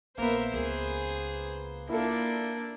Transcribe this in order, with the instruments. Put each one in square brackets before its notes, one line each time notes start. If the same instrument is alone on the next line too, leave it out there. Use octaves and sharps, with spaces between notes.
[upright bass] A#1 [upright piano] A#3 B3 [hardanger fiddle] A#4 E5 [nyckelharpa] C5
[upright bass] C#2 [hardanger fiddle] G#4
[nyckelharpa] A#3 [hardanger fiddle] D4 D5 [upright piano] E4 F4 A4